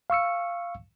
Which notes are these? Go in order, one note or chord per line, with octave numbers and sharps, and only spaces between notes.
F5 C#6 E6 C#7